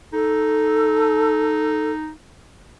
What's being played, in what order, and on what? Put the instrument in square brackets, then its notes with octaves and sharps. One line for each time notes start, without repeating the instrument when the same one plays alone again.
[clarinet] D#4 [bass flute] A4